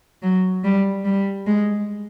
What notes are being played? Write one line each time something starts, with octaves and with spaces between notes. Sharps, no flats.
F#3
G3
G3
G#3